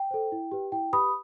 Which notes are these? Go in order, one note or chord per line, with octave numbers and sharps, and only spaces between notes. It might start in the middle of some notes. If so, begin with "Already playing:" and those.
Already playing: G5
A4 C5
E4
G4 B4
E4 G5
G4 B4 B5 D#6